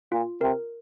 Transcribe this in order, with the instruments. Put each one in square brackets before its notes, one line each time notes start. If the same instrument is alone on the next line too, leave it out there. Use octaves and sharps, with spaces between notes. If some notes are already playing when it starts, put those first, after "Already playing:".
[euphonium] A#2 [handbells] F4
[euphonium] C3 [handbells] A#4